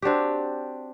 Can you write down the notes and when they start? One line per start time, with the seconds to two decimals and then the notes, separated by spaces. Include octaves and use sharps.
0.02 C4 D4 F#4 G4